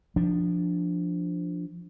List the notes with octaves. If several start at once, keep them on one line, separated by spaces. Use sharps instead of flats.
F3 D4